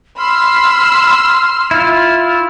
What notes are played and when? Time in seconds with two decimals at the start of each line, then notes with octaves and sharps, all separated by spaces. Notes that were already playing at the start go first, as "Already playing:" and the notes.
0.18 B5 C6 E6 F6
1.71 E4 F4